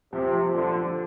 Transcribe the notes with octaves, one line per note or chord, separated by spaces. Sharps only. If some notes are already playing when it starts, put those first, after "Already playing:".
C3 F3
F3
D3 F3
F3